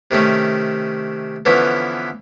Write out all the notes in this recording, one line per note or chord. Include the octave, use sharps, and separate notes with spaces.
C3 D#3 A3 C#4
D3 E3 F3 B3 C#4